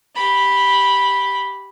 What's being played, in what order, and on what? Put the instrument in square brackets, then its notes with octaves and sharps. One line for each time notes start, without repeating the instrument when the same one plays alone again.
[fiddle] G4 B5